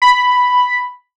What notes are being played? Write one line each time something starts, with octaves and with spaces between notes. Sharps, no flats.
B5